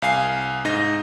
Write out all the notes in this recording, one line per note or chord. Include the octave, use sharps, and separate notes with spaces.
C2 F5 G#5 C7
G#2 D#4 D#5 A#6